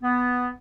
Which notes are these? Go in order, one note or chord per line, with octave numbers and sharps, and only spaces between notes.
B3